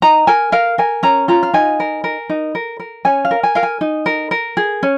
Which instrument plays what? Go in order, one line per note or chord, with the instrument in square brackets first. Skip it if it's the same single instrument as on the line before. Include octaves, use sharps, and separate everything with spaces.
[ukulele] D#4 A#5
A#4 G#5
A#4 F5
A#4 G#5
C#4 A#5
F4 A#5
F5
D#4 G#5
A#4
A#4
D#4
A#4
A#4
C#4 G#5
F5
A#4
G#5
A#4 F5
G#5
D#4
A#4
A#4
G#4
C#4